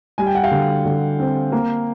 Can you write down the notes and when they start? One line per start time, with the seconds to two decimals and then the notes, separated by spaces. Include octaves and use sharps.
0.18 G3 G#5
0.27 G5
0.35 F#5
0.43 F5 G5
0.51 D3
0.85 D3
1.20 C4
1.52 A#3